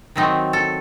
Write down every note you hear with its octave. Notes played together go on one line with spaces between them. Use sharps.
D#3 F#3 A3 C4 D#4 D#5
A4